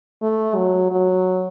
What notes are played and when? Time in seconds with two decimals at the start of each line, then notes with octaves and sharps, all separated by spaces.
0.22 A3
0.56 F#3
0.92 F#3